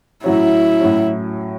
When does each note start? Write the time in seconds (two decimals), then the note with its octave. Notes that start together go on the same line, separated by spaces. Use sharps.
0.24 A2 F#3 C#4 E4
0.80 A2 F#3 C#4